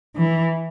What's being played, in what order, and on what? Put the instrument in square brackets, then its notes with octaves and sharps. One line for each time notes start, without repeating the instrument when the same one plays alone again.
[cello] E3